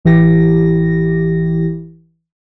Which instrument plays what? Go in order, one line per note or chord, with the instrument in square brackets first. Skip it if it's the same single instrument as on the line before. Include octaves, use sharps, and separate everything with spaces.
[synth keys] A1 E3 E4 G4 A#6